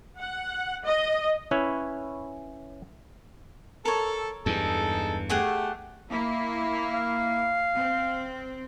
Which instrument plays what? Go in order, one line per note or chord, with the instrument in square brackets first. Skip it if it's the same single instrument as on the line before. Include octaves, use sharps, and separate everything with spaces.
[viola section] F#5
D#5
[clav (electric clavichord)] C#4 E4 B4 C#5
[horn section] A4 [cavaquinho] A#4 C#5
[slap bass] E2 G2 [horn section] G#3 D#4 A4
[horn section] A3 [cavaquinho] G4 G#4 F#5
[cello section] A#3 E4
[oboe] F5
[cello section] C4